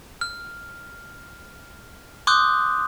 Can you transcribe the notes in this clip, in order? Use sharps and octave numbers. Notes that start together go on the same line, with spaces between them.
F6
C6 D6 D#6 F#6 G6